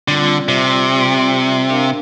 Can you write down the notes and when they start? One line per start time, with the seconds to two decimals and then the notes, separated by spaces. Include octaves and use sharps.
0.08 D3 G3 C4 F4 D5
0.48 C3
1.69 D4 A#4 F5